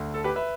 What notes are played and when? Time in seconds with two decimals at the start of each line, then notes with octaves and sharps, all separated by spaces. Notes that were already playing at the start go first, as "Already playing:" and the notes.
Already playing: D2 D3
0.14 A4
0.24 G4 B4
0.36 B4 E5